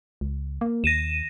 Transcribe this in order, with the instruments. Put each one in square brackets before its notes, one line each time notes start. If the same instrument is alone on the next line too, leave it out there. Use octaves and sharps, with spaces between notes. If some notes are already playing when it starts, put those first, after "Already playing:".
[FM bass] C#2
A#3
[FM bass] D#2 [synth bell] A#6 D#7 E7